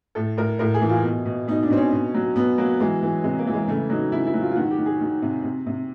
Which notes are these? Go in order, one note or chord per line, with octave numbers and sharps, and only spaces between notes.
A2 A4
A2 A#4
A2 A#4
G#4
E3
F4
B2
B2
B2 D#4
D4
B2 C4
C#4
B2
F#3
B2 B3
F#3 A#3
E3 G#3
E3
C3 G#3
A#3
E3
G#3
C#3 A3
F#3 D#4
C#3 E4
E4
F#3
F4
F4
D#3 F#4
G4
D#3
G#4
D#3
C3
C3
C3